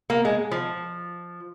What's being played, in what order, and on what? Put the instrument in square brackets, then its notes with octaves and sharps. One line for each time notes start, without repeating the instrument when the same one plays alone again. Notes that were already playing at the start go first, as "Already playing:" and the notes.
[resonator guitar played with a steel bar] A#3
G#3
F3